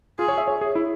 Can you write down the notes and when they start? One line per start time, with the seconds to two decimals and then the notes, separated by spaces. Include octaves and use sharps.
0.19 F4 G#4
0.28 C#5
0.38 E5
0.48 C#5
0.61 G#4
0.75 E4